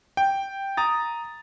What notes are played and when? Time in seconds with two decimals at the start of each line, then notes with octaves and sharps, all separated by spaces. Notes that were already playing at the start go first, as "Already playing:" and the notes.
0.17 G5
0.77 A#5 D#6 A6